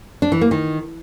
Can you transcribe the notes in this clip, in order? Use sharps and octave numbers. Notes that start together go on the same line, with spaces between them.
D4
E3
A#3
D#3